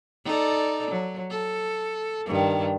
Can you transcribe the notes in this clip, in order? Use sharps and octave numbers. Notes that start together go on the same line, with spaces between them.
D#4 A4 D5
F#3
A4
G2 D#3